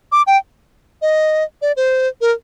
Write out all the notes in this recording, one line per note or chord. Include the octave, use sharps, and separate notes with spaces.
D6
G5
D#5
D5
C5
A#4